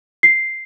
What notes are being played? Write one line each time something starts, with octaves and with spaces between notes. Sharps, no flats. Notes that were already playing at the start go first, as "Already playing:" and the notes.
C7